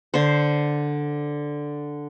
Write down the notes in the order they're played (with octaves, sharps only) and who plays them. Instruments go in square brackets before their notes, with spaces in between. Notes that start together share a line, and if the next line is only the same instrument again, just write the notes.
[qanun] D3 C5